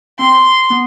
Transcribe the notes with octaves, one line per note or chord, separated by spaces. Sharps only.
C4 C6
B3